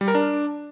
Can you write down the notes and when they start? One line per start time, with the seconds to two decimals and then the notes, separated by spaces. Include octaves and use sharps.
0.01 G3
0.08 A#4
0.15 D4